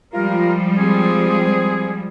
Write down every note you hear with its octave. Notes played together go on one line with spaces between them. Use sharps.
F3 G3 G#3 F4 G4 A#4
C4 G#4